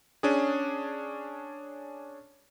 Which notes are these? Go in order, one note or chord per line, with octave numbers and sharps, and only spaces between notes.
C#4 D4 G#4